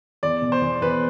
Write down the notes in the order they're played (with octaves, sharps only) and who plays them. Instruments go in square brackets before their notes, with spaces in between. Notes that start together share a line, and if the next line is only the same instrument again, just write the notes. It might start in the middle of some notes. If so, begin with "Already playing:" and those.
[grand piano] E2 D5
B2
C5
E2
E2 B4